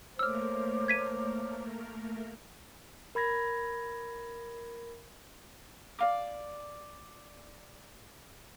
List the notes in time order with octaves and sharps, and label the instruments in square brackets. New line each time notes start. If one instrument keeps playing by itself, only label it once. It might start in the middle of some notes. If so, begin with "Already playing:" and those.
[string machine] A3 A#3 A#4 [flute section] C5 C#5 D6 [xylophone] E6 F6
[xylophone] G#6 B6 D#7
[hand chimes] A#4 B5 G#6 A#6
[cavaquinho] D5 F5 D6